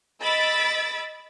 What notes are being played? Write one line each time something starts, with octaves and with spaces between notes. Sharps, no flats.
D#5 B5 E6 A6 B6 D7